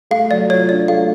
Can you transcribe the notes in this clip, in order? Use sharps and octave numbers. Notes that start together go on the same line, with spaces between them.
A3 F5
F#3 D5
F4 C#5
D4 D5
A3 F5